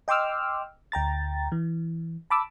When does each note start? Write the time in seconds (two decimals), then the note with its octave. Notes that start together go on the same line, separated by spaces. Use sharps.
0.08 D#5 G5 C6 D6 E6 F6
0.92 D2 G5 A#5 A6
1.52 E3
2.30 A5 B5 D6 E6